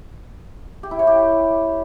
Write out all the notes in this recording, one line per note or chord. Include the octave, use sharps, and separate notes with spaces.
G4
E4
C#5
G4